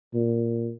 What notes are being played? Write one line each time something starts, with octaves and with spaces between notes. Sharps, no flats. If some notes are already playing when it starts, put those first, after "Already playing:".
A#2